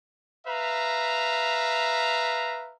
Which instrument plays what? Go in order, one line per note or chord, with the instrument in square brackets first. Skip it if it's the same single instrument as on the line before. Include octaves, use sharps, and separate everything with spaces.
[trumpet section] B4 E5 F5 A#5